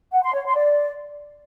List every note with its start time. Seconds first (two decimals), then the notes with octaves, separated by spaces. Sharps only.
0.13 F#5
0.24 C6
0.35 C#5
0.45 C6
0.56 D5